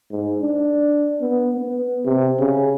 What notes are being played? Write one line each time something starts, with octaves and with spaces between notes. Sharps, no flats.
G#2
D4
B3
B3
C3
C#3